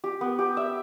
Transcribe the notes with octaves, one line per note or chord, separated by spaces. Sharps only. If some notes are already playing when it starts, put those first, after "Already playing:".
G4
B3
G4
E5